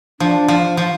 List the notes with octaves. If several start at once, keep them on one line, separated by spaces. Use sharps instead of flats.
F3 D4
F3
F3